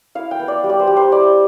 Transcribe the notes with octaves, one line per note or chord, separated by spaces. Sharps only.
E4 F5
G5
B3
D5
G3
D5
C5
G3
C5
E4 D5